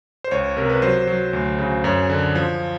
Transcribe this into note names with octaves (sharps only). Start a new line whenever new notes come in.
C5
C#2 C#5
C3 A#4
B4
F#3 C5
F#3
D2
C#3
F#2 C#5
D3
F3